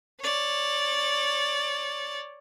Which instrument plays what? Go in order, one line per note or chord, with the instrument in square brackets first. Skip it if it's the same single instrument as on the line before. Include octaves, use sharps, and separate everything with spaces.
[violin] C#5 D5